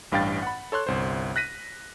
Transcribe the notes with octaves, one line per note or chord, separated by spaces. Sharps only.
A1 G2 F5 G5 A6
F#5 B5
A4 C#5 C6 F#6
G1 C2 C5
F#6 A#6 B6 D#7